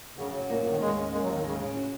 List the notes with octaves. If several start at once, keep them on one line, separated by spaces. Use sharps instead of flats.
F#2 C#3
F#3
A#2 A#3
A#2
F#2
D#3
D#2 G#3
C#4
G#3 A#3
F#3
D#2
D#3
C#3 G#3
C#3
F#4